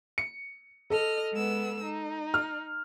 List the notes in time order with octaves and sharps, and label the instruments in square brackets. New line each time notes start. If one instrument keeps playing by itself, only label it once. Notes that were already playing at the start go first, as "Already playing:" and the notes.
[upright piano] C#7
[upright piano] A4 [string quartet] D#5 F6
[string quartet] G#3 B3 E6
D#4
[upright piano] F6